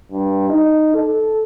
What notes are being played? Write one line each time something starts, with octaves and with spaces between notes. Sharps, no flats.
G2
D#4
A4